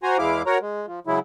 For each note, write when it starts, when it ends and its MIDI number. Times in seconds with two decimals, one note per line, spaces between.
0.03 0.17 66
0.03 0.17 72
0.03 0.17 80
0.03 0.17 82
0.18 0.42 40
0.18 0.42 56
0.18 0.42 64
0.18 0.42 77
0.18 0.42 86
0.46 0.58 66
0.46 0.58 70
0.46 0.58 73
0.46 0.58 82
0.61 0.86 56
0.87 1.00 53
1.07 1.19 49
1.07 1.19 54
1.07 1.19 56
1.07 1.19 64